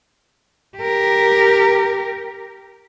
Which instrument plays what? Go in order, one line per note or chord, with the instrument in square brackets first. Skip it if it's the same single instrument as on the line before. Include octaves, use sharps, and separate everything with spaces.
[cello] G4 A#4